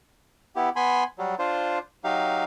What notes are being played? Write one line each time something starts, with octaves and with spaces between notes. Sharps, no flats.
B3 E4 G4
B3 G#5 B5 C6
F#3 G3
D4 F4 C5
F#3 D#4 G4 F5